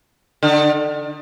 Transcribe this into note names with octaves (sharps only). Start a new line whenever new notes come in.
D3